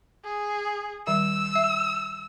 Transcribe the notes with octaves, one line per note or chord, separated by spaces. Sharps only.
G#4
D#3 G3 E5 E6
E5